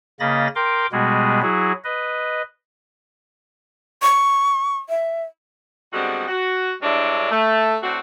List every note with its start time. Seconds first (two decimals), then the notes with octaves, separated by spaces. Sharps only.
0.20 C#3 A#3 D#5 B5 A6 A#6
0.56 A#4 G5 C6 D6
0.92 B2 G3 G#3 B3 F#4 G#4
1.42 F#3 E4 F#4 G#4
1.84 B4 D#5
4.02 C#6
4.89 E5
5.93 D3 G3 G#3 B3 C4 F#4
6.28 F#4
6.82 G2 C3 G#3 D4 E4 C#5
7.30 A3
7.83 A2 C4 D4 F#4